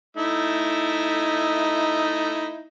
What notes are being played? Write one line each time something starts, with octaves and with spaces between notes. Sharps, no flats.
A3 D#4 E4